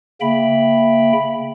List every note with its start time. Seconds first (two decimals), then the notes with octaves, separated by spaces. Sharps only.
0.21 C#3 A#3 E5 G5 B5